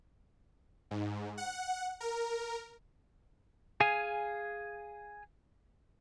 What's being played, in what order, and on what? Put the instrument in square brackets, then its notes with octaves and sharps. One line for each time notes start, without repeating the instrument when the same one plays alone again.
[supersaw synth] G#2
F#5
A#4
[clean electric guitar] G#4 F5 G#5